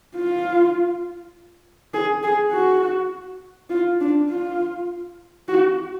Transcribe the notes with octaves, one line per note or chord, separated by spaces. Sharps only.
F4
G#4
G#4
F#4
F4
D4
F4
F#4